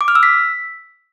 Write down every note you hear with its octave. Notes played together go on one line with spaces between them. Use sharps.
D6
F6
E6
B6